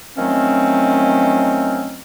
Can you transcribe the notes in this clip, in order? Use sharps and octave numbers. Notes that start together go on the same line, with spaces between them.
D#3 F3 F#3 A3 C4 C#4